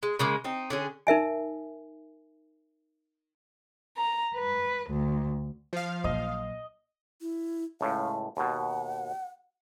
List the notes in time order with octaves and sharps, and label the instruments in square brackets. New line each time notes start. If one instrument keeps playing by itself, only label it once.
[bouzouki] G#3
C#3 G#3 A#3
C4 D#4
D3 C#4 G#4
[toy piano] D#4 A#4 E5 G#5
[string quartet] A#5
B4
D2
[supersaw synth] F3 F5
[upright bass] A#1 F#3 [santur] D#5
[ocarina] E4
[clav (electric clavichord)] C#2 A2 [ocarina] F5
[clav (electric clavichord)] D#2 B2 [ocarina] F#5